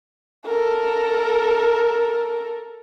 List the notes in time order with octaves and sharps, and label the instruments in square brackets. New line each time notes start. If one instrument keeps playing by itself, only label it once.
[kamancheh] A4 A#4